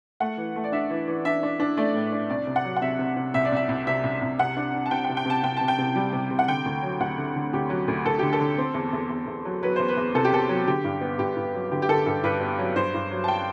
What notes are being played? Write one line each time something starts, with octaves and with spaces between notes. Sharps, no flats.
A3 F#5
E3
A3
D5
D4 E5
E3
E3
D4 E5
D4
D4
A3 D5
A2
D4
C2 D5
C3
F#5
F#3
F#5
C3 E5
C3
C3
C2 E5
D5
C2 E5
C2
C3 E5
C2
C2
C3 F#5
D4
D4
A5
C3 G5
G5
C3
G5
C3 A5
C3 G5
C3 A5
G5
C3
G3
C3
C3
F#5
D3 G5
D2
F#3
D2 F#5
D3
D3
D2 G4
F#3
D2
D2 A4
D3 G4
A4
D3
C4
E2
E2
E2
E2
F#3
F#3 B4
E2 C5
B4
E2
C3 A4
G4
C3 A4
F#3
D3 G4
G2
B3
G2 G4
G2
F#3
D3 G4
G4
D3 A4
G2 A4
G2 B4
B3
F#3
G2 C5
G2
F#3
A5
G5